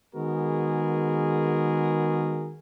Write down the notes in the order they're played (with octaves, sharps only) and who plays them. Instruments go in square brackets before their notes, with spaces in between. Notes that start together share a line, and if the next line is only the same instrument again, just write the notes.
[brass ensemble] D#3 G#3 B3 F#4 G#4 A#4